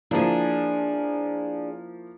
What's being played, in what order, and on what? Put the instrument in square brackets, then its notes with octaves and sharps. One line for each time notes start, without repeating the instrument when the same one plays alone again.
[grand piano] F3 A#3 E4 [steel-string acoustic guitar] D4 G#4